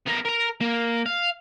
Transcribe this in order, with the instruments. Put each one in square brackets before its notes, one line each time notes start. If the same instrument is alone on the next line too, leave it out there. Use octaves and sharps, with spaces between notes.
[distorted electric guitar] B3 A#4
A#4 A#5
A#3
F5